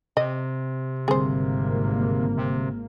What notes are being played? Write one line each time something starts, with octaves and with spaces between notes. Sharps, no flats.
C3 D#5
G#1 D3 G3 A#3 C4 G#4 C5
C3